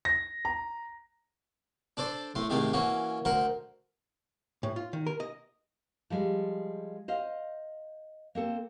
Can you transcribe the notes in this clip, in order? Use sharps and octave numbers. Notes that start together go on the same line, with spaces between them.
A#6
A#5
D4 A4 C5 D5
A2 A3 C6
G#2 C3 D#3 A3 A#3
E3 A#3 C#4 F#4
D2 A#4 C5 F#5
A2
F4
D#3
A#4
D#5
F3 G3 G#3
C5 D#5 F5
A#3 C4 A4